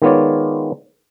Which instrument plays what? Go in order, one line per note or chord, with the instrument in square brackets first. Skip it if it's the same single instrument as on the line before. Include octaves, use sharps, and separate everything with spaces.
[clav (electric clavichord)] D#3 G#3 B3 F4 C#5 D5